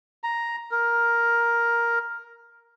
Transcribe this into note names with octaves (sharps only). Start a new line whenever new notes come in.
A#5
A#4